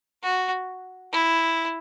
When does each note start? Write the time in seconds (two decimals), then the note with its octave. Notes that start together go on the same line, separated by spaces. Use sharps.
0.23 F#4
1.13 E4